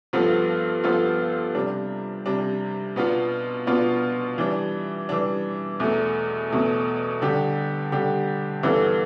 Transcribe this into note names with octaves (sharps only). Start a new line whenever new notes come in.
G2 F3 B3 F4 A4
G2 F3 B3 F4 A4
C3 G3 D4
C3 G3 D4
B2 B3 D4 F4
B2 B3 D4 F4
E3 G3 D4
E3 G3 D4
E2 B2 A3
E2 B2 A3
D3 G3 D4 G4
D3 G3 D4 G4
G2 E3 B3 D4 A4